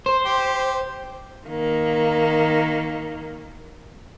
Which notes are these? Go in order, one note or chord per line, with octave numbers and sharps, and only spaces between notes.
C5
G4
D#3 A#3